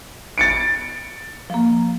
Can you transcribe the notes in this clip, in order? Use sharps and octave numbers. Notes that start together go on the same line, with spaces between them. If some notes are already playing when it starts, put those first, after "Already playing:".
A6 C#7 D7
F3 A#3